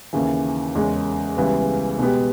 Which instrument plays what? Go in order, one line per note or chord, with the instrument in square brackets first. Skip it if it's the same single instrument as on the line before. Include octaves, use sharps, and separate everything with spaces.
[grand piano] D#2 C#3 E3
E2 C#3 G#3 C#4
C#2 C#3 E3 G3 B3
B2 G#3 B3 G4